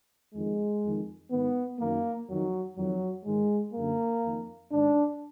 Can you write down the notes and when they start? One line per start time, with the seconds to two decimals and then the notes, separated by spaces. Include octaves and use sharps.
0.34 F2 D#3 G#3
0.83 F2 D#3
1.31 G#2 D#3 B3
1.80 F#2 D#3 A#3
2.28 F2 D#3 F#3
2.76 F2 D#3 F#3
3.26 G#2 D#3 G#3
3.74 F#2 D3 A#3
4.23 F2 D#3
4.71 G#2 D#3 D4